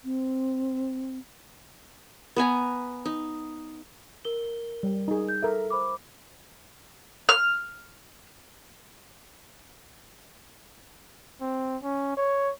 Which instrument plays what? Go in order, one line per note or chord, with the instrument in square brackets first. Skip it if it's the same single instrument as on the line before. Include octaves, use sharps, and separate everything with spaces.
[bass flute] C4
[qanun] B3 B4 G#5 A#5
D#4
[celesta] A#4 G7
[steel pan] G3
D#4 G#4
[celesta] G6
[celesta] A4 [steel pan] A#4 E5
[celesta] C5 B5 D6
[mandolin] F6
[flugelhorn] C4
C#4
C#5